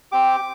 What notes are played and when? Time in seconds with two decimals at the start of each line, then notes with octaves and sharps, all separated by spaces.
0.12 C4 G4 D6